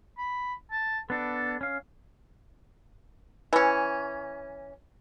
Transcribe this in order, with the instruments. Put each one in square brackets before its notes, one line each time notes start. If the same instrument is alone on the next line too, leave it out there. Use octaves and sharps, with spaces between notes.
[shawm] B5
A5
[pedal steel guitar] B3 D4 [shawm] A4
[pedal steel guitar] C#4 F5
[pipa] E3 C#4